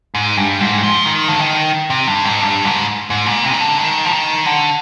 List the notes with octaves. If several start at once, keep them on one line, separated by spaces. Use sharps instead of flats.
G#2
G2
G#2
F3
D#3
D3
D#3
C3
G2
G#2
G2
G#2
G#2
A#2
C3
D#3
D3
D#3
F3
D#3
D3